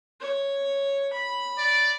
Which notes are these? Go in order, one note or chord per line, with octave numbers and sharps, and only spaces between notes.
C#5
B5
D5